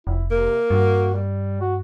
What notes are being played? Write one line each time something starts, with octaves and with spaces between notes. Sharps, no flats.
F1 E4
C3 A#3
G2 F#4
G3
F#4